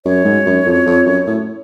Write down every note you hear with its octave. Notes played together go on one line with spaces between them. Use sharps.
F#2 C#5
G#2
F#2
F2
F2
F#2
A2